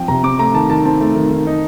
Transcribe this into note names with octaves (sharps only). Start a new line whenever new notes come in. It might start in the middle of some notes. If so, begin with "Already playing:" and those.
Already playing: F3 C4 G5
C3 A#5
C4 D6
A3 A#5
D#3 A5
D#3 A5
C4 A5
A3
D#3
D#3
D#4